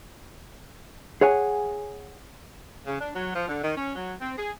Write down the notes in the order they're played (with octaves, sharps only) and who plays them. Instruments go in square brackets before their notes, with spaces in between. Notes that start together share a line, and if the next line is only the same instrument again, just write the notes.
[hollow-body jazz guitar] G#4 C#5 F#5 G#5
[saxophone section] C#3
D4
F#3
F3
D3
D#3
C#4
F#3
C4
G#4